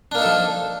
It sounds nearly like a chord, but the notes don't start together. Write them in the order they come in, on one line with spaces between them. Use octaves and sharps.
D4 A#3 D#4 A4 F3